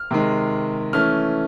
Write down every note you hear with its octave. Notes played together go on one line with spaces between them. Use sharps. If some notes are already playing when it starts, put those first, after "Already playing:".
Already playing: F6
C3 D#3 G#3
E3 A3 C#4 F6